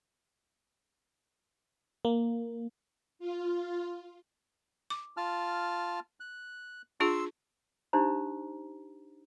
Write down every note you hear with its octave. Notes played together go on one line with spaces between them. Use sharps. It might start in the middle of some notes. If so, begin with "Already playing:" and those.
A#3
F4
D6
F4 A5 F6
F#6
D4 F4 G#4 C6 E6
D4 D#4 G4 C5 A#5